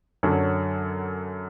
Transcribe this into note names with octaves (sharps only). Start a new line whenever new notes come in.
F#2 D3 F#3 C#4